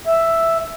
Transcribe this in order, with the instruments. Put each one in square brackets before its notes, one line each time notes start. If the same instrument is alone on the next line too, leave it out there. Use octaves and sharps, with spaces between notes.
[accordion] E5